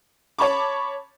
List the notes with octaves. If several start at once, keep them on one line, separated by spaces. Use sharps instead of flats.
C#5 A5 B5 C#6 D6